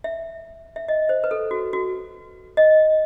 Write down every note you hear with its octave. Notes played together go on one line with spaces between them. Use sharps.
E5
E5
D#5
C5
B4
A4
F#4
F#4
D#5